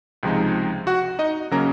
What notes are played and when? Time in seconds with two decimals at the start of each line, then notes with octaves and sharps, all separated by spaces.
0.23 C#2 C3 F3 G#3 D#4
0.87 F#4 F#5
1.19 D#4 D#5
1.51 C#3 F#3 A#3 C#4 A#4 A#5